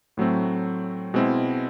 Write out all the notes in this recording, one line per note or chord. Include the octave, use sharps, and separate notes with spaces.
A2 F#3 A3 C4
B2 G#3 C4 E4